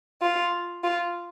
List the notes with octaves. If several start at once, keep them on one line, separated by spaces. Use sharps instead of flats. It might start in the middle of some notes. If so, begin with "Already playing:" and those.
F4
F4